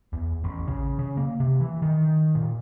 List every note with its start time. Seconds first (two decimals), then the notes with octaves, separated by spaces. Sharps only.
0.13 E2
0.44 A1
0.68 C#3
0.99 C#3
1.17 A#3
1.40 C3
1.60 E3
1.82 D#3
2.35 A#2